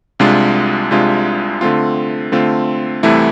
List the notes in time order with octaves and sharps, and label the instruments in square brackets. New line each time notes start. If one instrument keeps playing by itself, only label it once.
[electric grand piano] C2 C3 G#3 D4 F4
C2 C3 G#3 D4 F4
D3 A3 C4 F4
D3 A3 C4 F4
C2 C3 E3 A3 E4